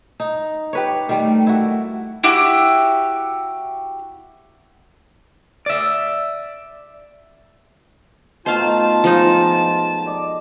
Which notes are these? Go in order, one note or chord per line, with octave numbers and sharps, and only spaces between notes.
D#4
G4 B4 C#5
D#3 G3 A3
E4 F#4
E4 F#4 G4
D5 E5
B2 D#3 A3 F4 C5 F5 A5
F3 G#3 D#4
D5 D#5